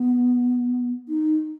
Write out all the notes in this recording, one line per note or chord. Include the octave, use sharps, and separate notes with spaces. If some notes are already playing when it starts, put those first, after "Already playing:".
Already playing: B3
D#4